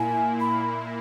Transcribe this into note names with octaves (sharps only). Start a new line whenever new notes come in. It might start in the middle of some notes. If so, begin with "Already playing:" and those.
Already playing: A#2 A#3 E4 G#5
B5